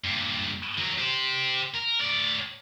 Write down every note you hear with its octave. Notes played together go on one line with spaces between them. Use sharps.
G2 A#2
D3 F#3
G4 C5
A#4
A2 D5